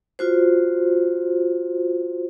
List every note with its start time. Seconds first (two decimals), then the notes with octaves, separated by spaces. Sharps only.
0.19 F4 F#4 C5